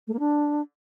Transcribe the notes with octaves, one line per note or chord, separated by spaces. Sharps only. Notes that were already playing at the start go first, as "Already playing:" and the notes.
A3
A#3
D4